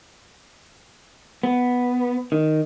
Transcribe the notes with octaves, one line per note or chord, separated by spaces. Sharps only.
B3
D#3